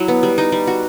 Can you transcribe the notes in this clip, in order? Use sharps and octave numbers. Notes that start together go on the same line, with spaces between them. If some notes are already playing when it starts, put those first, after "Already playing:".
Already playing: F#3 E4
B3
G3
D#4
G3
F#4